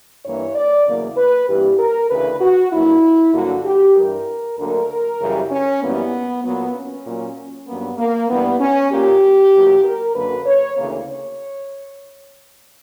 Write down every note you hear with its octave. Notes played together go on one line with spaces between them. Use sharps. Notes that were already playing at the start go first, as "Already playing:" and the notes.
G2 E3 A#3 C#5
D5
E2 C#3 F#3 A#3
B4
G2 E3 G3 A#3 G4
A#4
D2 C#3 E3 B4
F#4
G2 F#3 A#3 E4
G2 D3 F#3 A#3 F#4
G4
G2 E3 G3 A#4
D2 D3 F#3 A#3 A#4
F#2 C#3 E3 G3
C#4
F#2 E3 G3 A#3 B3
A#2 F#3 A#3 B3
C#4
A#2 F#3 A#3
G2 F#3 A#3 B3
A#3
G2 E3 G3 B3
C#4
A#2 A#3 G4
E2 B2 F#3 A#3
A#4
F#2 D3 F#3 A#3 B4
C#5
D2 C#3 E3 A#3
C#5